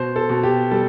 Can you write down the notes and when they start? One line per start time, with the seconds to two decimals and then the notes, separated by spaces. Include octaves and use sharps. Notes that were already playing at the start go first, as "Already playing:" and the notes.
Already playing: B2 C5
0.16 A4
0.29 B2
0.43 G4
0.71 G3 A4